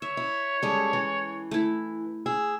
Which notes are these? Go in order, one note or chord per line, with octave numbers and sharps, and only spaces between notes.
C#5 E5
E4
G3 G#3 C#4 A4
E3
A3 E4
G#4 E6